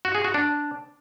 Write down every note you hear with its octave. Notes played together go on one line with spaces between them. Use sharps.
F#4
G#4
F#4
D4